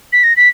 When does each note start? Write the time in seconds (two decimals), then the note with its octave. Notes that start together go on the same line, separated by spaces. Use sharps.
0.13 B6
0.24 A#6
0.37 B6